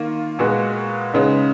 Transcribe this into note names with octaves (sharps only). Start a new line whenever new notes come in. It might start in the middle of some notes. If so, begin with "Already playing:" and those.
Already playing: D#3 A#3 F4
A#2 G#3 B3 F#4
C#3 G#3 B3 D#4